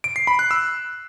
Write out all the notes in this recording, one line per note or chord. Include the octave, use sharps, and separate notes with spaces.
D7
C7
B5
F#6
E6